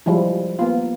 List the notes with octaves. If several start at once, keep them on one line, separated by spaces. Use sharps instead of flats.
F3 G3 G#3 E4
A#3 B3 F4